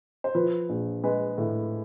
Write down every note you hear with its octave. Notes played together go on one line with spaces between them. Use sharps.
C5
F3 B4
A#1
G#3 B4
A2